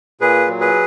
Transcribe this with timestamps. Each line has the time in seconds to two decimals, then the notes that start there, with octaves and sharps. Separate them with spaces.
0.21 A#2 G#4 B4
0.48 F#3
0.60 G#4 B4